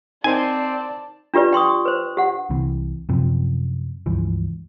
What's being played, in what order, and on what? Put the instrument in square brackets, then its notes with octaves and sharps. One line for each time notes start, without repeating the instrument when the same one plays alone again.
[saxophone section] C4 [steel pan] D#4 A#4 C5 [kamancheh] D5 A5 [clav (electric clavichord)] G#5
[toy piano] D4 F4 G4 B4 D5
G5 C6 C#6 D#6
B4 C5
G4 F#5
[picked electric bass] C2 C3 E3
F#2 C3 F3
C#2 G2 E3 F3